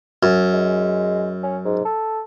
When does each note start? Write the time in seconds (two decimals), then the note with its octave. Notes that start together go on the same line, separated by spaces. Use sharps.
0.23 F#2
0.53 G#3
1.43 C#4
1.65 G#2
1.85 A4